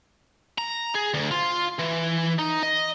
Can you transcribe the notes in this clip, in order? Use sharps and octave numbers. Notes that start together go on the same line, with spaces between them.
A#5
G#4
D2
F4
E3
D#4
D#5